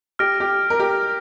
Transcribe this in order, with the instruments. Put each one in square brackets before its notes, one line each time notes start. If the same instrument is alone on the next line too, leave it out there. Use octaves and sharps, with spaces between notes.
[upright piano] G4 [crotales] F6 A#6 D7
[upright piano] G4
A#4
G4